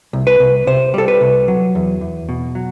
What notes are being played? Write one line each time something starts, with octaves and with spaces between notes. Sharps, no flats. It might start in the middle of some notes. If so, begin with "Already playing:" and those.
C2
B4
C2
C3 C5
G3 A4
B4
C2
F#3
E2
E2
B2
F#3